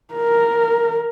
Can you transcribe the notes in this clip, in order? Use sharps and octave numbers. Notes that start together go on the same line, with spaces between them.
A#4